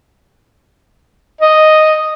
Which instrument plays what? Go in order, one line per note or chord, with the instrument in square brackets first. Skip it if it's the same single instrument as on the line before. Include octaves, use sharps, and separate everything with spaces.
[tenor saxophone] D#5